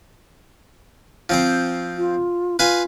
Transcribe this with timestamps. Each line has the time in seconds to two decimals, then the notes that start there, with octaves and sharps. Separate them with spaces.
1.30 F3 C4 C5
1.97 F4
2.59 F4 B4 F5 G#5